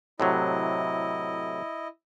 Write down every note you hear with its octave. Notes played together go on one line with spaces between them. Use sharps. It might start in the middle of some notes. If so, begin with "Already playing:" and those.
A2 C3 F#3 E4 D#5